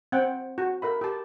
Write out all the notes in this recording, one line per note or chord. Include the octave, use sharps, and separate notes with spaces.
C4 F#5 G5
F#4
A#4 E5 B5
G4 A5